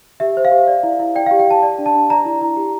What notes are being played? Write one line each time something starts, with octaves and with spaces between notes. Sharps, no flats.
G4 E5
C5
F5
G4
D5
E4
E4
D5 G5
F5
G4
G5
G4 A5
D5
D4
A5
D4
D5 A#5
E4
E4
G4